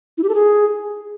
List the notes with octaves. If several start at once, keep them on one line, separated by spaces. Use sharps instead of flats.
E4
G4
A4
G#4